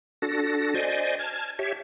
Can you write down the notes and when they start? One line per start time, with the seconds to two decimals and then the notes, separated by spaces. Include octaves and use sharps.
0.22 D4 F#4 A4 A#6
0.74 C5 D5 D#5 G#5
1.19 A5 F6 G#6
1.59 G4 C#5 E5